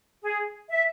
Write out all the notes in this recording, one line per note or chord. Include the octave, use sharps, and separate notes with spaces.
G#4
E5